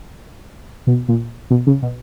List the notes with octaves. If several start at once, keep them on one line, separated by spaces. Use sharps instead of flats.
B2
A#2
B2
C#3
B2